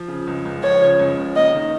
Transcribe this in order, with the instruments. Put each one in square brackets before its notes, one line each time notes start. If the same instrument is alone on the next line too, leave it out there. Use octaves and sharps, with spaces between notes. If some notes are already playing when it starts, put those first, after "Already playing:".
Already playing: [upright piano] F3
C#3
C#2
C#2
[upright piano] F3 [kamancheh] C#5
[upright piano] C#3
C#2
C#2
[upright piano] A#3 [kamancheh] D#5
[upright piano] D#3